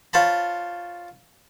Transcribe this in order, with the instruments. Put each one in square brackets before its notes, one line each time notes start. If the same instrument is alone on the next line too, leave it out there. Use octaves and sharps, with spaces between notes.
[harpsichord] F4 C5 C#5 A5 B5